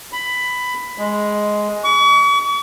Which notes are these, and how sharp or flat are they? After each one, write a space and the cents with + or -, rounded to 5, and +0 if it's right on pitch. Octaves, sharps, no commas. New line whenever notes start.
B5 +10
G#3 +5
C#6 +40